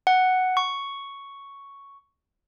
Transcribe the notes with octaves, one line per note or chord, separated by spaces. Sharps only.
F#5
C#6